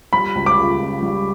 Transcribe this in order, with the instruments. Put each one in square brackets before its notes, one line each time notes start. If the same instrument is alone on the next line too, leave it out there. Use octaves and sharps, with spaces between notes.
[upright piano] G3 [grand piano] B5
[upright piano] C#2
[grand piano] D6
[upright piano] C#3
C#2
G3